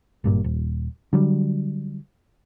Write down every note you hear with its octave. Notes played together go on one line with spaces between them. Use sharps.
G#1 G2 A#2
D#1
D3 F#3 G3